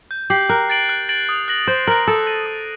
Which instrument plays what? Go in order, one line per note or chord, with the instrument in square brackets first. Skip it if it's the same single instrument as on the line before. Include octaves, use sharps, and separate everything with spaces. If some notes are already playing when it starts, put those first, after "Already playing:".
[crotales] G6
[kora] G4 [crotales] C7 F#7
[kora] A#4 [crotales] F#6
[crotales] A6 D7 F#7
F#6
A6 D7 F#7
D#6
F#6 A#6 F#7
[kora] C5 [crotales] D#6
[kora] A#4 [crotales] F#6 A#6 F#7
[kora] A4 [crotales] D#6
[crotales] F#6 A#6 D#7 F#7
D#6